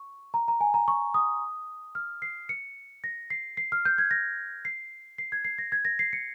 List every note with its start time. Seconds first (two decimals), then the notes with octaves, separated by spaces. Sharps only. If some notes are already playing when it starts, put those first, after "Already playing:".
Already playing: C#6
0.34 A#5
0.48 A#5
0.61 G#5
0.74 A#5
0.88 C#6
1.14 D#6
1.95 F6
2.22 C7
2.49 C#7
3.04 A#6
3.30 C7
3.57 C7
3.72 F6
3.85 G6
3.98 G#6
4.11 A#6
4.65 C7
5.18 C7
5.32 G#6
5.45 C7
5.58 A#6
5.72 G#6
5.85 A#6
5.99 C7
6.13 C#7